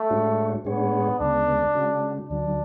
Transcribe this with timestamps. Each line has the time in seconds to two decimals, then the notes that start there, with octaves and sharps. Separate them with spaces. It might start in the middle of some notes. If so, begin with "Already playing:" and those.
Already playing: A3
0.10 A2 G#3 D4 F#4 C#5
0.65 A2 G#3 B3 D4 G#4 C#5
1.19 D2 C#3 G#3 B3 D4
1.74 C#3 G#3 C#4 F#4
2.29 D2 D3 F#3 D4